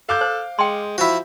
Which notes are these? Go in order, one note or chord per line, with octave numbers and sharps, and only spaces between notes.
A4 F5 D6 G6
C5
G#3 G5 C6
F3 E4 F#4